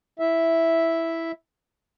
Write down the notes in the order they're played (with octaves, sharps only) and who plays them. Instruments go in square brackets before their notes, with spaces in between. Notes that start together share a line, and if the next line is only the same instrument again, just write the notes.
[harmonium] E4 E5